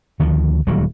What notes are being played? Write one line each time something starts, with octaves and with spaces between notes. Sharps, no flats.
D2 D#3 F3
D#1 D2 F#3 G3